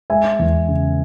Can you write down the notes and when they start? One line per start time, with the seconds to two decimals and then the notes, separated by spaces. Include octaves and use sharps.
0.10 G#3 E5 G#5
0.39 E2
0.68 C#3